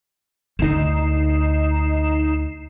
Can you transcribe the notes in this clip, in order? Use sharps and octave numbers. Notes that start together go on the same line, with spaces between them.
D2 D3 D#4 C7 E7